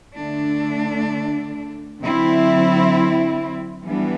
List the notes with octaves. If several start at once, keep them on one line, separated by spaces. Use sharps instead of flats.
D3 A3 D4
D3 F#3 C4 E4
E3 G3 B3 D4